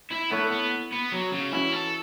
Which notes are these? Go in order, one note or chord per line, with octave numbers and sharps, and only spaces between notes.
E4
A3 B3 E4 C#5
B3
B3
F#3
C#3
E3 C#4 E4 F#4 C#5
A4